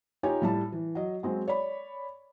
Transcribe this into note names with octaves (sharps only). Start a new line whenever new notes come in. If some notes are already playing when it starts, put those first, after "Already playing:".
D#4 F4 G4 C#5 G#5
A2 G3 A5
E3
F#3 D#5
F#3 G#3 C4
C#5 D5 B5